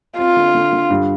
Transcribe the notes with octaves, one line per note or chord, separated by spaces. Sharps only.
C4 F4
D3
D3
D3
G2